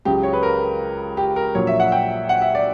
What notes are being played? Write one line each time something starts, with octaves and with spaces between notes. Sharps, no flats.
C#2 C#3 F#3 G4
C#5
B4
A#4
G4
A#4
A#1 A#2 F#3 C#5
E5
F#5
G5
F#5
E5
D5